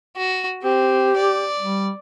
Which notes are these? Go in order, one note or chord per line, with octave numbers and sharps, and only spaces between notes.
F#4
C4 G4
D5
G3